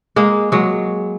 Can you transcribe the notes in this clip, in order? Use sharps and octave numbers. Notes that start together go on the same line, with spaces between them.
G#3 A#3
F#3 G#3